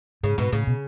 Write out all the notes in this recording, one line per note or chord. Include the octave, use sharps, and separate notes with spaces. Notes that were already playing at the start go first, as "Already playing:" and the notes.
G#2 C#3
G#2 B2
A2 C#3
B2